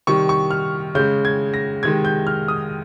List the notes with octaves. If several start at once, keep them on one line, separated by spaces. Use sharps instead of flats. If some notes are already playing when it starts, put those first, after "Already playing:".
C3 D#3 G3 C#6
C#6
F6
C#3 G#3 G6
G#6
A#6
C3 D#3 G#3 G#6
G6
F6
D#6